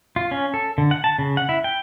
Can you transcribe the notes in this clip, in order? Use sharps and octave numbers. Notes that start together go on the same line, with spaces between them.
F4
C#4
A4
D3
F#5
A5
C#3
F#5
E4
G5